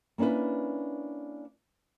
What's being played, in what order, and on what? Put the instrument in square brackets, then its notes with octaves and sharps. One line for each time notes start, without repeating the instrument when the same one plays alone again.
[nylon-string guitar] A#3 C#4 D4 E4 B4